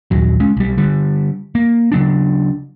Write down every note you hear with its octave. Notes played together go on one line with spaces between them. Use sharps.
A#1 D#2 F#3
G#3 C#4
B1 G3
D3 G3
A#3
C#3 F#3 D4